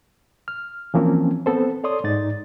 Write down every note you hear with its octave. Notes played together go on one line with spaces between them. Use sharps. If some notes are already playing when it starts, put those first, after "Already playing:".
F6
E3 F3 A#3 C4 C#4
B3 C4 A4 C5
A4 C#5 D5 C6 D#6
G#2 D#4 D5 A6